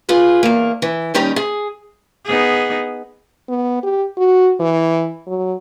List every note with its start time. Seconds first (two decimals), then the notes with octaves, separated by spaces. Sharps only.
0.09 F4 G#4 B4
0.43 E2 A#3
0.82 E3
1.14 D#2 G3 C#4 D#4 G4 A#5
1.36 G#4
2.25 B3 D#4 G#4
3.49 B3
3.83 G4
4.17 F#4
4.60 E3
5.27 F#3